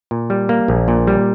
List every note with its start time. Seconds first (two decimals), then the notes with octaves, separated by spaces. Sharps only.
0.11 A#2
0.30 G3
0.49 A#3
0.68 A#1
0.88 A#2
1.07 G3